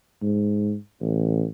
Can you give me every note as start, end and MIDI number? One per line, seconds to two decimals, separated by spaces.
0.22 0.75 44
1.01 1.45 33